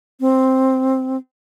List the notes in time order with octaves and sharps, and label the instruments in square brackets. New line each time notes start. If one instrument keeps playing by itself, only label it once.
[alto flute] C4